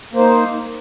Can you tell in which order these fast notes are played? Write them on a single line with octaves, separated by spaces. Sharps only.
A#3 C5 D#4